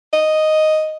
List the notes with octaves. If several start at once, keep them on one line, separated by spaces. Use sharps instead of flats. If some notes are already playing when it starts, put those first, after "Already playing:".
D#5